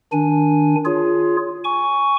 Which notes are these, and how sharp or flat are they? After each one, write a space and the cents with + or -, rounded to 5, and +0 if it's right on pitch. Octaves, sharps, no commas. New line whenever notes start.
D#3 +0 D4 +0 G#5 +0
F4 +0 G#4 +0 C#5 +20
G#5 +0 C#6 +10